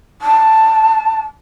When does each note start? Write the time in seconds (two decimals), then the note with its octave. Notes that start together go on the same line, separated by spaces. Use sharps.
0.22 A5